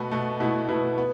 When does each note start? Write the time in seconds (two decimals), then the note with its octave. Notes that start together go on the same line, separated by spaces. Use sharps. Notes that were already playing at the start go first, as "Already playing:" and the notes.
Already playing: B2 A3 F#4 B4
0.11 B2 A3
0.40 B2 A3 B3 E4
0.69 B2 A3 B3 E4
0.98 B3